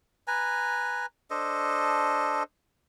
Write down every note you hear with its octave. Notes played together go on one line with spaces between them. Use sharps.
B4 G#5 A#5
D4 A4 C5 D#5